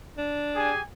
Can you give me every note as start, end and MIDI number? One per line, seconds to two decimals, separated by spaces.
0.18 0.72 62
0.55 0.80 67
0.55 0.80 68
0.55 0.80 80